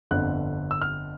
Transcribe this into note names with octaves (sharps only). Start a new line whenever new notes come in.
G1 F2 D3 F#6
E6
F6